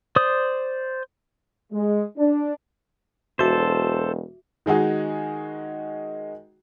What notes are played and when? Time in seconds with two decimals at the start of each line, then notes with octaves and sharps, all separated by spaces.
0.16 C5 D5 D#6
1.72 G#3
2.18 D4
3.39 E1 F#4 A4 C5 E5 D6
4.66 D#3 G#3 D#4 F#4 G#4